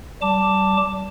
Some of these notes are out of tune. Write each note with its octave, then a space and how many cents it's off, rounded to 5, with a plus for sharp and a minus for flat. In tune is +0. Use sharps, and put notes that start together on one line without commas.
G3 -30 A5 +10 D6 +0